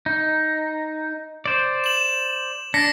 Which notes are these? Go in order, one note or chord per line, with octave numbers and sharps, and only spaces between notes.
D#4
C5 D5
E7 F#7
D4 A#6 B6 C#7